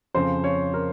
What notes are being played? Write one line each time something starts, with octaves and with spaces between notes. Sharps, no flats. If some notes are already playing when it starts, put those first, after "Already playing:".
F2 C#3 F3 C5
C#5
A#4